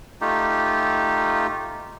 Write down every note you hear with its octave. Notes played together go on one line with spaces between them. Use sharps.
A3 D#4 F4 G4